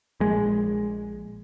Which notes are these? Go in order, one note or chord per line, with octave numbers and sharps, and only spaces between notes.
A#1 G#3